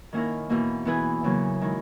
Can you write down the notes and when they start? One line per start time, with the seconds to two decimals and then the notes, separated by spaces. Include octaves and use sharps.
0.13 D#3 A#3 C#4 E4 A#4
0.50 E2 B2 A#3
0.85 E3 B3 E4 G#4 B4
1.24 E2 C#3 F#3 A#3
1.61 D#3 G#3 C#4 E4